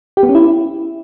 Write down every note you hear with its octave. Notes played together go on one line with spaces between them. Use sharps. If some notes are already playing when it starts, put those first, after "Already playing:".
G4
B3
C#4
E4